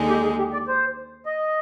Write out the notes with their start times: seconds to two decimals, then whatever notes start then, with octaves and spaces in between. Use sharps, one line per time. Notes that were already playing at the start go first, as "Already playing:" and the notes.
Already playing: D#2 D3 G#3 D#4
0.09 G4
0.24 G#4
0.38 G4
0.53 D5
0.68 C5
1.26 D#5